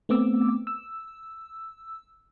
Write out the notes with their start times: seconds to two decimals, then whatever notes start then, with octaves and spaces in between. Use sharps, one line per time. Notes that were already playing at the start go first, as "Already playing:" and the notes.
0.09 A3 B3 C4 D6 E6
0.67 E6